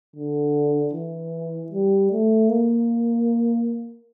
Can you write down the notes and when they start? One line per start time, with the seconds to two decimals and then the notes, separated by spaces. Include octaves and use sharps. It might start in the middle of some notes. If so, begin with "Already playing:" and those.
0.16 D3
0.93 E3
1.72 G3
2.11 A3
2.49 A#3